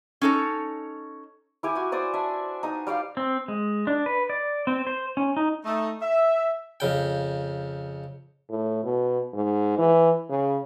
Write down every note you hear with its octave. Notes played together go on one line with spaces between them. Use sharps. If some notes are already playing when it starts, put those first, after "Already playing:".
C#4 D#4 A4 C#5
E4 G4 G#5 D6
F#4 G#5
C5 D5 D#6
D4 E5 G#5
D#4 D#6
G3 G4 D5 F5
C4
G#3
D4
B4
D5
C4
C5
C#4
D#4
A3 D#4
E5
F2 C#3 G5
A2
B2
G#2
E3
C#3